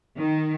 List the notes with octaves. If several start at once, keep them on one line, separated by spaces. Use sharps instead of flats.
D#3